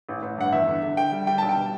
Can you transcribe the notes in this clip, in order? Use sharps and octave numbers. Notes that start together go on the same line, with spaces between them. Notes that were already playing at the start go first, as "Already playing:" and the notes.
A1
A1
G2 F#5
E2 E5
D3
D3
D3 G5
G3
G3 G5
B1 A5
G5
B2